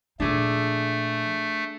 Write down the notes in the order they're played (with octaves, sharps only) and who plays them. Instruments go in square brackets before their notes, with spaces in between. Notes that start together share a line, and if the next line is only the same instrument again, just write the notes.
[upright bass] A#2 F3 [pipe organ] A3 [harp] D4 G#4 A4